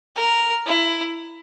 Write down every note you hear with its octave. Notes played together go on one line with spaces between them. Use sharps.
A#4
E4